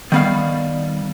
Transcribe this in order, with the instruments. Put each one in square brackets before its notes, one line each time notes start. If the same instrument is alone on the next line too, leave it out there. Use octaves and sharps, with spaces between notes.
[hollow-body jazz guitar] D#3 B3 F5 [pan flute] G3